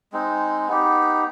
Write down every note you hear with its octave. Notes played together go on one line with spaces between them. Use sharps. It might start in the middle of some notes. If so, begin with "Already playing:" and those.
G#3 C4 D#4
B3 D#4 G4